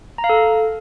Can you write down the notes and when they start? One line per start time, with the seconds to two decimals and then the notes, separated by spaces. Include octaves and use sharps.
0.18 A#5
0.24 F5
0.29 A4